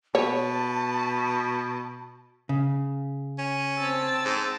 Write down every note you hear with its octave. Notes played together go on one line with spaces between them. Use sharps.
B2 C#5 A5
C#3
C#4
C4 A5 E6
G#2